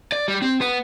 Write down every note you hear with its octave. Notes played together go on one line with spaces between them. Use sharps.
D5
G3
C4
B3